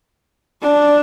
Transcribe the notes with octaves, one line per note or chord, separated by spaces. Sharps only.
D4